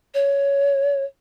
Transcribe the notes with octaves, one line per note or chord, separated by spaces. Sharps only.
C#5